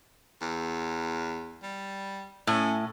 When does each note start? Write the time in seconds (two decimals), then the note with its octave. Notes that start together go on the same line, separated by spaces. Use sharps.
0.41 E2
1.63 G3
2.47 A2 C#4